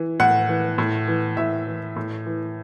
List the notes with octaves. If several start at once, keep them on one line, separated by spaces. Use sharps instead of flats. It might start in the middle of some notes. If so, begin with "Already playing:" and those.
Already playing: E3
A2 F#5
E3
A2
E3
A2 E5
E3
A2
E3